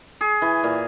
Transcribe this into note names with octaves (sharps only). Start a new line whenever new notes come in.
G#4
E3
A#2